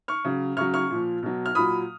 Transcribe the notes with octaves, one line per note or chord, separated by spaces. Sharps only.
C#6 F6
C#3 F#3
C#3 F#3 C#6 F6
C#6 F6
A#2 F3
B2 F#3
F6
A#2 F#3 B5 D#6